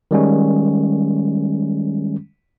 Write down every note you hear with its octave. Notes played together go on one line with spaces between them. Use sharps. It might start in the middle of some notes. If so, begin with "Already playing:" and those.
D#3 G3 G#3 C#4